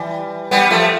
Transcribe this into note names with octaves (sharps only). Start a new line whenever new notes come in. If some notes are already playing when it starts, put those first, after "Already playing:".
Already playing: E3 G3
G3 B3
F3 A3